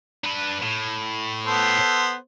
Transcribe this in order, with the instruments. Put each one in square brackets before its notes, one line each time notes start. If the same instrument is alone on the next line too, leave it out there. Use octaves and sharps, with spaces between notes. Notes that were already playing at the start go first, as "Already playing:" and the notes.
[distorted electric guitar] D4 B4
A2
[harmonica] B3 A4 C5